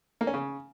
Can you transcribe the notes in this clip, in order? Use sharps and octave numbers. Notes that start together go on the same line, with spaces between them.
A#3
C#4
C#3